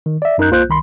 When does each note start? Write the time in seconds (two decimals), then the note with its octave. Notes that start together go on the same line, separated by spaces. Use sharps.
0.06 D#3
0.22 D5 E5
0.38 F#2 D#4 A#4 A#5 F#6 G6
0.50 C2 A#3 F4 C5 F#6 G6
0.68 C2 D#3 B5 C6